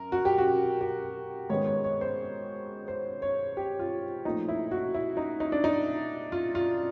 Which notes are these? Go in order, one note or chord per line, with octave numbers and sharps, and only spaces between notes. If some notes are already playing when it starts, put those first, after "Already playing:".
Already playing: F#2 A#4
F#4
G4
F#4
G4
G#2 D#3 G#3 B3 C#5
C#5
C#5
C5
C5
C#5
G4
F4
A#2 F3 A3 D#4
E4
F#4
E4
D#4
D#4
D4
D#4
F4
F4